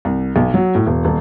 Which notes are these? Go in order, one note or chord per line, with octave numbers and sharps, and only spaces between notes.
C2
B1
F#3
A2
E1
D#1